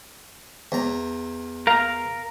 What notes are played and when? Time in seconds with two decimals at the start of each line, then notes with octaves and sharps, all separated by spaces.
0.72 E2 A#5
1.67 A#4 F5